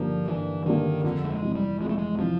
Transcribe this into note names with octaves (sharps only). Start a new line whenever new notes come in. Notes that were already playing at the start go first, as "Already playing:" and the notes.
Already playing: G2 D3 F3 G3 A#3
G2 E3
D3 D#3 G3 A#3
F2 D3
A3
G#3
C3 E3
G3
F2 G#3
A3
G#3
C3 E3 F3